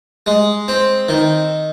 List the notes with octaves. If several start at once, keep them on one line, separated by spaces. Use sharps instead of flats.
G#3
C4
D#3